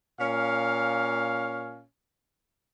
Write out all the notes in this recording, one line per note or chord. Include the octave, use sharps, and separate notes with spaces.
A#2 C#4 F5